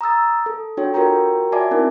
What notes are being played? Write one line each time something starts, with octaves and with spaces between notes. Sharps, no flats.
A#5 D#6 E6 A6
A4
D4 F#4 A4 C#5 G5
F4 F#4 A#4 C#5 G5 A#5
F#4 D5 E5 G#5 A5 D6
C4 D#4 E4 A#4